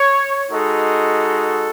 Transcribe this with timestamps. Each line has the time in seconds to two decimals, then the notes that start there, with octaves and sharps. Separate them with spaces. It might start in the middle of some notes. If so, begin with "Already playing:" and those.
Already playing: C#5
0.51 G#3 D#4 F#4 A4